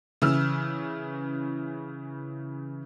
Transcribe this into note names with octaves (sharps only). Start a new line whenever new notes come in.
C#3 E3 E6 F6